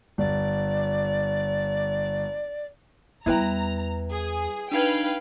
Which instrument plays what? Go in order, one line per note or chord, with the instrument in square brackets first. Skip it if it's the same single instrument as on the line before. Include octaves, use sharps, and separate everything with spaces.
[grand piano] G1 [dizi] D5
[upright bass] E2 G3 [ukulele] E4 B4 G5 [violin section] A#5
[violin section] G#4
[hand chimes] D4 D#4 G#6 [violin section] B4 F5 G5